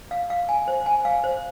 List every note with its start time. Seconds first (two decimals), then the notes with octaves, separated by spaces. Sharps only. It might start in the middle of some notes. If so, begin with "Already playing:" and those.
0.11 F5
0.30 F5
0.49 G#5
0.68 C5
0.86 G#5
1.05 F5
1.24 C5